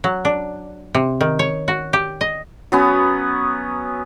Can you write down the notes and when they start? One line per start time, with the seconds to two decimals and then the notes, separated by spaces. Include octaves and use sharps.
0.04 F#3
0.25 D4
0.95 C3
1.21 D#3
1.39 C#5
1.68 F#4
1.93 G4
2.21 D#5
2.72 F#3 B3 C#4